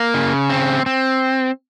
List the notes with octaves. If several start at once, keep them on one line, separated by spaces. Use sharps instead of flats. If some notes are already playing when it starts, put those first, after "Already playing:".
Already playing: A#3
C#3
C4
C4